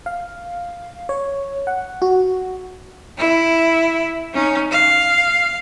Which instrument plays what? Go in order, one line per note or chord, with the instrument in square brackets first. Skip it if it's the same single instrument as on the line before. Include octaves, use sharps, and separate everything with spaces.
[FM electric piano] F5
C#5
F#5
F#4
[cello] E4
C#4 D#4
F5